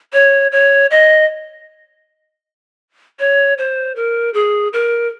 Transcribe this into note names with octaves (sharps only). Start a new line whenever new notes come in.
C#5
C#5
D#5
C#5
C5
A#4
G#4
A#4